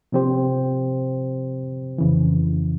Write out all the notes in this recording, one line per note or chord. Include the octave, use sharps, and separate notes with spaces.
C3 F3 C4 G4 C5
F2 C#3 E3